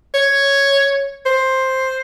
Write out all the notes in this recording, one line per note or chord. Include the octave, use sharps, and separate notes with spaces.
C#5
C5